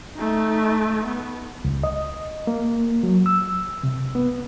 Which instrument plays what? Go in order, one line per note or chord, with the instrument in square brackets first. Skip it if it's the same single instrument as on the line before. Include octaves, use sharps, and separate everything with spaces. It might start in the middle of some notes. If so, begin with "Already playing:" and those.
[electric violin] A3 D#4
B3
[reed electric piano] C#2
D#5
A#3
F#3
E6
C3
B3